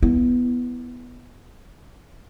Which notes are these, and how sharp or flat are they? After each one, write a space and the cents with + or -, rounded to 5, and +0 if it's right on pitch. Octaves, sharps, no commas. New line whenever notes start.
B3 +0 E4 +0